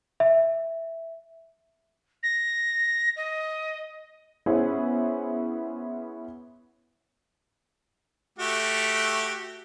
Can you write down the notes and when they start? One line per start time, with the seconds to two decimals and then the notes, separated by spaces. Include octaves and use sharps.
0.20 E5
2.23 A#6
3.16 D#5
4.46 B3 C#4 E4 G#4 C5
8.39 A3 F#4 G4